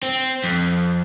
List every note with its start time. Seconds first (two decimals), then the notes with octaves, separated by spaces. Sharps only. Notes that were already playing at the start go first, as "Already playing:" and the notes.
0.03 C4
0.44 F2